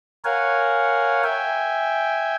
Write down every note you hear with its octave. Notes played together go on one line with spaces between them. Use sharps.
A#4 C#5 F5 F#5 G#5
E5 G5 G#5